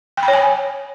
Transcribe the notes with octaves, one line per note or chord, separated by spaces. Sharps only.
G5
B5
C#5
G#5